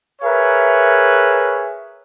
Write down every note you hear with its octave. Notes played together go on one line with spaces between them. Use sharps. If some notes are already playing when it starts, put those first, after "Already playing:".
G#4 A#4 B4 C#5 E5